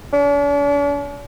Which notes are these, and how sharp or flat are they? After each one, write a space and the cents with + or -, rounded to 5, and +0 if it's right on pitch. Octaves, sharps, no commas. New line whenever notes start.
D4 -45